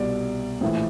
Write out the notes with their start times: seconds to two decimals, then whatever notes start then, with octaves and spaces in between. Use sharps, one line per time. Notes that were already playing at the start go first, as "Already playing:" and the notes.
Already playing: C2 B2 D5
0.61 A#1 A2 E3